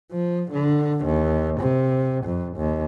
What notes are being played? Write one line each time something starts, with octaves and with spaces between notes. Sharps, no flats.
F3
D3
D#2
C3
F2
D#2